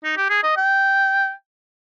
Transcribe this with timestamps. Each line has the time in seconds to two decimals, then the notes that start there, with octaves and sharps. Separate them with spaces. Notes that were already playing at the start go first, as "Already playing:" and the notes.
0.04 D#4
0.17 G4
0.30 G#4
0.43 D#5
0.57 G5